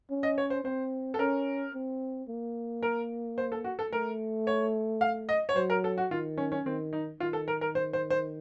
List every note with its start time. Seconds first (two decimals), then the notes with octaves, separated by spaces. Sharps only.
0.10 C#4
0.23 D#5
0.38 C#5
0.50 C5
0.64 C4 C5
1.14 A4
1.19 C#4 A#4
1.74 C4
2.28 A#3
2.83 A#4
3.38 C5
3.52 A4
3.64 F#4
3.79 A4
3.93 A3 A#4
4.47 C#5
5.01 F5
5.29 D#5
5.49 C#5
5.56 F#3 C5
5.70 A#4
5.84 A4
5.98 F#4
6.11 D#3 F4
6.38 C#4
6.52 C#4
6.65 D#3 C4
6.93 D#4
7.20 D#3 F4
7.33 A4
7.48 A#4
7.61 A#4
7.75 C5
7.93 C5
8.10 C5